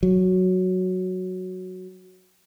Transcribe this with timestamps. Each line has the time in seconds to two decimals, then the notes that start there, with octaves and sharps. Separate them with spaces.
0.03 F#3